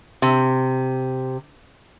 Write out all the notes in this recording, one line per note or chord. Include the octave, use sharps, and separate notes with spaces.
C3